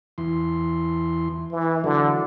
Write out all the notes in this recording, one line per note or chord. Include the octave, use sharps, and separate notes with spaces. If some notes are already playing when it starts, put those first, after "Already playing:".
E2 E3 C6
E3
D3 E3 F#3 A4